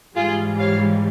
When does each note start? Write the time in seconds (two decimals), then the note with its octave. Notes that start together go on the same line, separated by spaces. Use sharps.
0.16 G#2 E3 G3 F4 G#4
0.59 C#5 F5